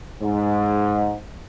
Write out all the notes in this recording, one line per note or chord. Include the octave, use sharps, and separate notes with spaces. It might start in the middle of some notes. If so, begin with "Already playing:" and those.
G#2